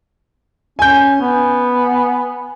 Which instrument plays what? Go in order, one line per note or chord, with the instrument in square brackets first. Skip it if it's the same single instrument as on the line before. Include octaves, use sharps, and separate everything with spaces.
[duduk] C#4 [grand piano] G#5 G6
[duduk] B3